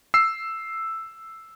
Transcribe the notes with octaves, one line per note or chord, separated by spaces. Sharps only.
E6 C7